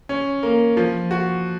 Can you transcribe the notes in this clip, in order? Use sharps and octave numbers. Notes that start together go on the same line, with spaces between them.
C#4
A#3
F3
F#4